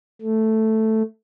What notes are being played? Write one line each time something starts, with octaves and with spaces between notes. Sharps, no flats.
A3